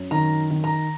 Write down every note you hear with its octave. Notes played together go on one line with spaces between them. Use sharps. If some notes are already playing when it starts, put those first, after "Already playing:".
Already playing: F#2
D#3 A#5
D#3
A#5